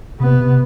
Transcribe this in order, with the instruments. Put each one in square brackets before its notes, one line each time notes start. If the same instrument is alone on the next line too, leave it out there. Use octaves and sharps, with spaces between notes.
[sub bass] C3 [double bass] B3
[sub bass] C3